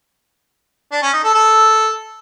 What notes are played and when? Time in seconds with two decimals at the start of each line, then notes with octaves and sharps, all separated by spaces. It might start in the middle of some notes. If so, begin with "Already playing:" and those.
0.92 D4
1.03 C#4
1.13 D#4
1.24 A4
1.34 A4